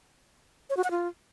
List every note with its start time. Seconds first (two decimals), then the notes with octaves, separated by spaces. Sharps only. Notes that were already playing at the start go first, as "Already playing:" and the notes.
0.70 C#5
0.77 F#4
0.84 F#5
0.91 F4